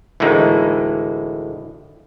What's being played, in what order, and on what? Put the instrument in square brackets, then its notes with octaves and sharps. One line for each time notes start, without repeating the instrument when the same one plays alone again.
[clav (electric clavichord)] D2 A2 E3 G#3 A#3 D#4